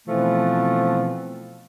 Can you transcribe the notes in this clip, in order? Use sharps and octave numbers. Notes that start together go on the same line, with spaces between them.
B2 E3 F3 A3 C4